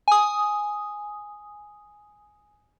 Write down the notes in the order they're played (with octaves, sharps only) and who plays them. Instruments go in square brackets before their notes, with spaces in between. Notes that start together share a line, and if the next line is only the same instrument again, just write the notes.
[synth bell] G#5 D#6